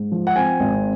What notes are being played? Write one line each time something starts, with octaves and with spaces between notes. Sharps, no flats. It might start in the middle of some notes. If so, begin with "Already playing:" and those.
Already playing: G#2
F3
F#5
C4 G#5
G#1